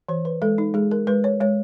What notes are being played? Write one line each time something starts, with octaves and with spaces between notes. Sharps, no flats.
E3 C5
B4
G#3 A4
D#4
G#3 G#4
A#4
G#3 B4
C#5
G#3 C#5